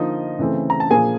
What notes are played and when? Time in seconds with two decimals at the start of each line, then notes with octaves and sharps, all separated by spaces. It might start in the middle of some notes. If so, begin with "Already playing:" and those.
Already playing: D3 F3 A#3 D#4 D#5
0.39 C#3 E3 A3 C4
0.70 A#5
0.80 A5
0.90 A#2 F3 A#3 G#4 G#5